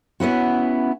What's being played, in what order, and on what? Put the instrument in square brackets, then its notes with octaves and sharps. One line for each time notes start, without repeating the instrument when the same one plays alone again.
[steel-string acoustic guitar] B3 C#4 E4 F#4